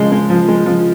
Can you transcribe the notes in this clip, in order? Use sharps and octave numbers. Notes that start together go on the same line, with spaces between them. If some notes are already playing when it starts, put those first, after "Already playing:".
Already playing: C#3 F3 G#3
G#3
F3
G#3
F3